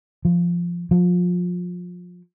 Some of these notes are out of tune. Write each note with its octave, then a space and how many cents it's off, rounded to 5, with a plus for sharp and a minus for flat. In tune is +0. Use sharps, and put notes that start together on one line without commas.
F3 -10
F3 +30